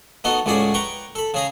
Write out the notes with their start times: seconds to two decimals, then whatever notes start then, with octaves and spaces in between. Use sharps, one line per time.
0.24 A3 B3 D#4 F#4 A4
0.46 C#2 A2 C#4 F#4 G#4 D5
0.74 B4 G5 A#5 C#6
1.15 A4 B5
1.34 C#3 G#4 A#5